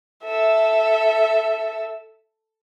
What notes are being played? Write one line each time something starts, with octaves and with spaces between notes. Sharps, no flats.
A4 E5